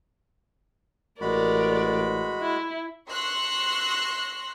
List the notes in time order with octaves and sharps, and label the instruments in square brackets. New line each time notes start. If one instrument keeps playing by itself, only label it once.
[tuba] A1 [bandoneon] G#3 F#4 B5 [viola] A#4 D5
[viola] E4
[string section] C6 C#6 E6 F#6 A#6 C7